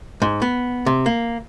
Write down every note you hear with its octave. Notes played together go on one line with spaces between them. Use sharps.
G#2
B3
C3
A#3